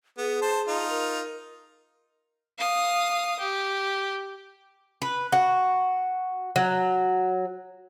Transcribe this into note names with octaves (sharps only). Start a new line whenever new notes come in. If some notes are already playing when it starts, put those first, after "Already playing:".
B3 G#4
C5 A5
D#4 F4
A#4
F5 D#6
G4
B4
F#4
F#3